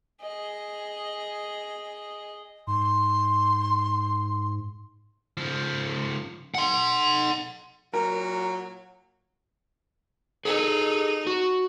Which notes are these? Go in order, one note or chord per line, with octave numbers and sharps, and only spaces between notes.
G#4 D#5
G#2 C6
C#3 F3
F#5 C6
A#2 F#3 A#4
D#4 G#4 A4
F#4